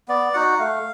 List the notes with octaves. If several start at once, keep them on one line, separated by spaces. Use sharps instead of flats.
B3 D5
D#4 F#4 F#5
A3 F5